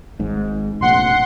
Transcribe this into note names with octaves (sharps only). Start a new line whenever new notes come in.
G#1 G#2
F1 A#1 F#5 C6